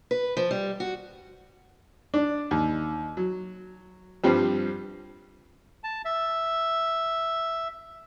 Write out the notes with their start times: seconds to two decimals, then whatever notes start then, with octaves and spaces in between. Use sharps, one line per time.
0.11 B4
0.37 F3
0.51 G3
0.80 F#4
2.14 D4
2.51 D#2
3.17 F#3
4.24 G2 F3 G3 C4
5.84 A5
6.05 E5